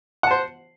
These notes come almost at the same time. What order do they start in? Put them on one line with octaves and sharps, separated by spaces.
F#5 A5 C5